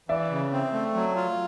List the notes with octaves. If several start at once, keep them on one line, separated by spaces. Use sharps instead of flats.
E3 D5 E5
C#3
C4
A3
F#3
F4